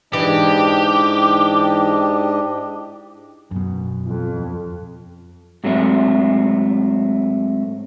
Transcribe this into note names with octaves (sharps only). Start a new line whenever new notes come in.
G#2 E3 D4 G4 D#5
F#2 B2
F2
G#2 F#3 A3 C4 E5